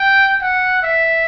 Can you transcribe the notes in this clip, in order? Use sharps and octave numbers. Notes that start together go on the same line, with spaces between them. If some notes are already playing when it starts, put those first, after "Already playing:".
Already playing: G5
F#5
E5